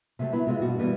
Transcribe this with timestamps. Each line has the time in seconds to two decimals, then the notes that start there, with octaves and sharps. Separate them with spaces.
0.19 C3 F#3 A3
0.32 F#3 B3 E4
0.47 C3 G#3 F4
0.62 G2 B2 F#4
0.79 E3 G3 B3